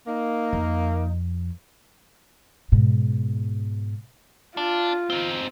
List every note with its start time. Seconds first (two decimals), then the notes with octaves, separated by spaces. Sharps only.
0.07 A#3 D#4
0.53 F2
2.72 G#2 B2
4.57 D4 F4
5.10 C4 D#4